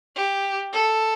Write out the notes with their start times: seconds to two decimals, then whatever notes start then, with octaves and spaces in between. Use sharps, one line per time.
0.16 G4
0.73 A4